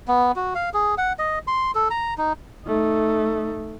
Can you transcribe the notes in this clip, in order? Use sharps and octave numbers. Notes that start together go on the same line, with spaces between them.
B3
F#4
F5
G#4
F#5
D#5
C6
A4
A#5
D#4
A3 D#4